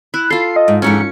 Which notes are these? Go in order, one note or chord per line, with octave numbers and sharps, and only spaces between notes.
E4 F#6
F4 A4 C7
D#5
G#2
F2 G#2 E3 C#4 C#7